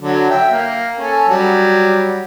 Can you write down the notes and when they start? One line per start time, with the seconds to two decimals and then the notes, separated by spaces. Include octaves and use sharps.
0.01 D3 F#3
0.30 E5 G5
0.51 A#3
0.99 C#4 A4 G#5
1.29 F#3 G3